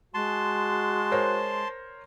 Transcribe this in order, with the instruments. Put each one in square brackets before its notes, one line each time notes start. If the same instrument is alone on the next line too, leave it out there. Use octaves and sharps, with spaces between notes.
[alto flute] G#3 [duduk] F#4 [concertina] A5 C6
[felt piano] A#4 C5 C#5